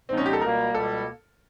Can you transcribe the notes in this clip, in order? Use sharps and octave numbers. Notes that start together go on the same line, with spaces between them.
A#2 F3 G#3 B3 C4 D#4
C#4
G4
A4
C#2 B2 G3 A#3 A#4
C#2 B2 G3 A#3 A4